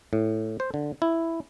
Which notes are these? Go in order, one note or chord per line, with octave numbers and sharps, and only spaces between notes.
A2
C5
D3
E4